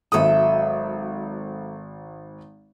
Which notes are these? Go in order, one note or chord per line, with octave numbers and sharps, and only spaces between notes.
G#1 F#3 A4 E5 D#6